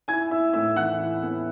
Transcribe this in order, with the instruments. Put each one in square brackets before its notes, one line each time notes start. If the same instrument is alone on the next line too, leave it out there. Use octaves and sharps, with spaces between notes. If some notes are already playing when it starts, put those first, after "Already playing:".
[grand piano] E4 G#5 G#6
E4 E5 E6
A2 E5 E6
E3 F#5 F#6
E4
B3